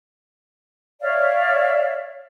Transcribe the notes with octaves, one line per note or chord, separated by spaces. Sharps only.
C#5 D5 E5 F5